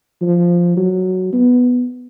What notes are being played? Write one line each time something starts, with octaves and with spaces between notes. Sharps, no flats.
F3
F#3
B3